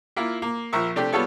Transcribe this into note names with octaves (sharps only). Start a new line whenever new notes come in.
A#3 E4 F4
A#3
A#1 F3 A#4 E5 C#6
C3 A3 D4 G4
G3 B3 F4 A4 C#5 C#6